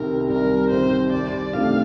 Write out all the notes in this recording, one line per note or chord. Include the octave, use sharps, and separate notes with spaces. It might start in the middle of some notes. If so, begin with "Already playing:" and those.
Already playing: C2 C3 D#3 A#4
C2 A#4
C3 D#3 C5
C2 D5
C3 D#3 A3 D4 F5